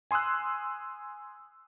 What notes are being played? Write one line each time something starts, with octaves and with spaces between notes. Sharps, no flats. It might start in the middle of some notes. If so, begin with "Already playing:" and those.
G#5 C6 D#6 E6 F#6